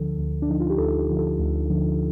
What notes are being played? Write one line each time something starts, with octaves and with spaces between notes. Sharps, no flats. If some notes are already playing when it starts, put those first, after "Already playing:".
Already playing: D2 D3 F3 A4
D2
D4
D3 F3 D#4
F4
G4
D2 A4
G4
D3 F3
A4
D2
D3 F3